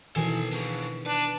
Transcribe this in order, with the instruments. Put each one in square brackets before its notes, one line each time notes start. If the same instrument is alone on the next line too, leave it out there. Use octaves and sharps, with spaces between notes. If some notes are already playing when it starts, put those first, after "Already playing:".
[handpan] B2 D#3 E3 [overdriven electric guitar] A4 G#5
[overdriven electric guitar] D4 G#4
[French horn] D4 [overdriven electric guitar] B4